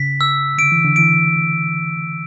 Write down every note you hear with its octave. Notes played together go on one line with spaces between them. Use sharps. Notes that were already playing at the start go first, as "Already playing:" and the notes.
Already playing: C#3 B6
E6
D3 D7
E3
D3
E3 D7